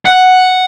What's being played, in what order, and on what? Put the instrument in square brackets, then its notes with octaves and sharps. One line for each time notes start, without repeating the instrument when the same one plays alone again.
[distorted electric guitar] F#5